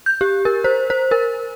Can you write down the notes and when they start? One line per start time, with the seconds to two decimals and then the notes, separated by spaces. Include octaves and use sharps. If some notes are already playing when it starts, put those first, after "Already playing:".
0.06 G6
0.21 G4
0.45 A#4
0.64 C5
0.90 C5
1.11 A#4